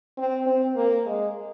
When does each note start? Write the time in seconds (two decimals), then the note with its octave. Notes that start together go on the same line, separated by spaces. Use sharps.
0.18 C4
0.47 C4
0.76 A#3
1.06 G#3